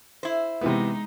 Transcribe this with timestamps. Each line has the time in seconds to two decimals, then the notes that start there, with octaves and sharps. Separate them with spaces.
0.23 E4 C5
0.61 C3 E3 G#3 B3 D#4